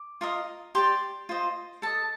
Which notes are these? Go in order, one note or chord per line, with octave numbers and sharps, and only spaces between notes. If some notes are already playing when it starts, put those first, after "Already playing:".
Already playing: D6
F4 A#4 D#5
G4 D5 C6
F4 C5 D#5
A4 D#5 A5